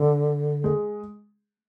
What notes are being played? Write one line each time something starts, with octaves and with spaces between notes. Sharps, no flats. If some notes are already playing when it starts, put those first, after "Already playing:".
Already playing: D3
G#3